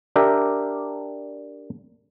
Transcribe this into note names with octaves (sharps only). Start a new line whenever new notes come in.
D4 G4 A#4 E5